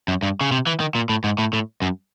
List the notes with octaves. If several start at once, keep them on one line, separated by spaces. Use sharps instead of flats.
F#2
G2
C#3
C3
E3
D#3
A#2
A2
G#2
A2
A2
F#2